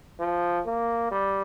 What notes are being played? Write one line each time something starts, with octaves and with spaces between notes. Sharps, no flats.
F3
A#3
G3